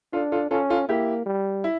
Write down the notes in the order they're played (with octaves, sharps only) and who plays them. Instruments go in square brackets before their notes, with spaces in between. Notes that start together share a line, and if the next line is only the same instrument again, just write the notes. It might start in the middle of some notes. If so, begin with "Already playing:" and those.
[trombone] D4 [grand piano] F4 A4
[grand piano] F4 A4
[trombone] C#4 [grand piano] F4 A4
[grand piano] F4 A4
[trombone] A#3 [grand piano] E4 G4
[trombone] G3
[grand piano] E4